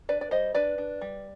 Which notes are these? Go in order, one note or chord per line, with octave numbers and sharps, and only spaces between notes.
D4 B4 D5
D5
G3 C5 D#5
D4 B4 D5
D4
G3